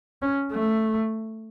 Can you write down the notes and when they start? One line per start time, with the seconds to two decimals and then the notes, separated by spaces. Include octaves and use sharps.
0.22 C#4
0.52 A3